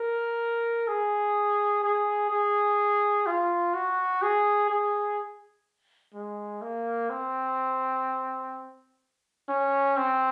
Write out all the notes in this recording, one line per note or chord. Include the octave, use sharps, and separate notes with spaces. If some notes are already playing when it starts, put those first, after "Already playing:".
Already playing: A#4
G#4
G#4
G#4
F4
F#4
G#4
G#4
G#3
A#3
C4
C#4
C4